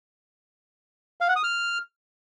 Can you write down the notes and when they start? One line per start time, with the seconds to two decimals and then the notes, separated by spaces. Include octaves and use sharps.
1.21 F5
1.28 F#5
1.36 D#6
1.44 F6